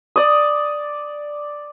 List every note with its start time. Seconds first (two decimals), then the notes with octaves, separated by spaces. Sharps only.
0.16 D5 D#6